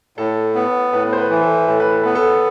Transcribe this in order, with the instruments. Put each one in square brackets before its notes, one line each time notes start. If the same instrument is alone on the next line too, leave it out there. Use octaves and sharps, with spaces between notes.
[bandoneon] A2 [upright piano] A4
[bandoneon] B3
[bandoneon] A2 [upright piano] B4
[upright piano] C5
B4
[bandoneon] E3
[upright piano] A4
[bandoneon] A2 [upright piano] A4
[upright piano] B4
A4
[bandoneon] B3 [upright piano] B4
[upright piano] A4